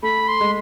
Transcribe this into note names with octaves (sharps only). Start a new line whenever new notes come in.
A3 B5
C6
G#3